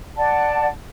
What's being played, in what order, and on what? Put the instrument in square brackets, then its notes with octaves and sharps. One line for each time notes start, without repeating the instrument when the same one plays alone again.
[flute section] D5 F#5 A5